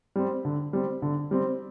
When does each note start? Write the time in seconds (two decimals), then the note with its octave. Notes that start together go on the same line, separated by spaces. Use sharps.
0.16 G3 C4
0.45 D3
0.73 G3 C4
1.02 D3
1.31 G3 C4